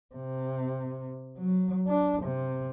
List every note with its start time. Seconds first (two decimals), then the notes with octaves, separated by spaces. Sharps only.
0.15 C3
1.38 F#3
1.88 D4
2.22 C3